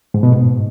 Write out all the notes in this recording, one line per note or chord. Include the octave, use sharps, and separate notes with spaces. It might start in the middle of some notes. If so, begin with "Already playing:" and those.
G#2
B2
G#2